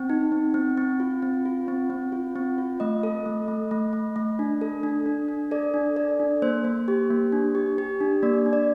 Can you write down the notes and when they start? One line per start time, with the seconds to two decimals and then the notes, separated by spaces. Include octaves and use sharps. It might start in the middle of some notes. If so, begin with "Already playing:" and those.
Already playing: C4 G5
0.10 D#4
0.32 C4
0.54 C4
0.77 C4
1.00 F4
1.22 C4
1.45 F4
1.68 C4
1.90 C4
2.12 F4
2.36 C4
2.58 F4
2.80 A3 D#5
3.03 A4
3.26 A3
3.48 A3
3.71 A3
3.93 A3
4.16 A3
4.39 D4
4.61 A4
4.83 D4
5.06 D4
5.29 D4
5.51 A4 D5
5.74 D4
5.96 A4 D5
6.20 D4
6.42 A#3 C5
6.65 A#3
6.88 G4
7.11 A#3
7.32 D4
7.55 G4
7.78 G4
8.01 D4
8.23 A#3 D5
8.46 D4
8.53 D5